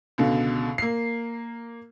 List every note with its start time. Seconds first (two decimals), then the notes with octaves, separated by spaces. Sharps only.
0.18 C#2 B2 D3
0.78 A#3 C7